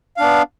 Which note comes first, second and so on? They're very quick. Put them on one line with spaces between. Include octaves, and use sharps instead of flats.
F5 D4 B3